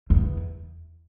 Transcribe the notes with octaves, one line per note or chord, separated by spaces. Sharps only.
E2